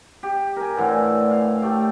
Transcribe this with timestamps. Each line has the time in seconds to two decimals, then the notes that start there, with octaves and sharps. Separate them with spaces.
0.23 G4
0.56 A#4 G#5
0.77 A2 D3 E3
1.30 F5
1.62 A3 G4